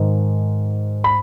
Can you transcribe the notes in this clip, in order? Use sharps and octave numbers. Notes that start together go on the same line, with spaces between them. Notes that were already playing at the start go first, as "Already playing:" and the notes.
Already playing: G#2 D#3
B5